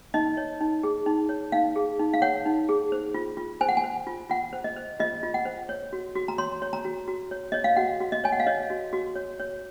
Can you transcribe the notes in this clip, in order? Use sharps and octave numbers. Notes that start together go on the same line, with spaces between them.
D#4 D#5
C#5
D#4
G#4
D#4
C#5
D#4 F5
G#4
D#4
F5
C#5 F#5
D#4
G#4
C5
F4
F4
C5 G#5
F#5
G#5
C5
F4
F4 F#5
C5
D#5
C5
F4 D#5
F4
F#5
C5
C#5
F#4
F#4
A#5
C#5 C6
C#5
A#5
F#4
F#4
C#5
C#5 D#5
F5
F#4 F#5
F#4
D#5
C#5 G#5
F#5
F5
C#5 D#5
F#4
F#4
C#5
C#5